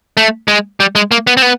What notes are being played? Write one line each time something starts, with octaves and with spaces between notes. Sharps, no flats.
A3
G#3
G3
G#3
A#3
B3
C4
B3